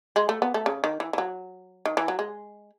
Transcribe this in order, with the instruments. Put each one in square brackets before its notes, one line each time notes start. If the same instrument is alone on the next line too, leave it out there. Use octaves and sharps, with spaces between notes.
[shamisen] G#3
A3
B3
A3
C#3
D#3
E3
E3
F#3
D#3
E3
F#3
G#3